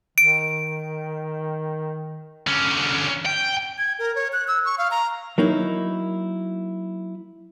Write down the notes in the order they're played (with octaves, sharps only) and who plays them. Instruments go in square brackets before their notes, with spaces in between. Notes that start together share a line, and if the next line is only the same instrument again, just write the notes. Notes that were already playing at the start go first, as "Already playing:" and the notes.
[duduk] D#3 [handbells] D7
[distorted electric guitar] D3 C#4
G5
[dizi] G#6
A#4
C#5
F#6
E6
C#6
F5
A#5
[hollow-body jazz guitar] F#3 A#3 D#4 E4